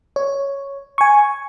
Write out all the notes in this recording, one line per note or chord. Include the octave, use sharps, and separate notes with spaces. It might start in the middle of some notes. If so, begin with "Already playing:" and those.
C#5
G#5 C#6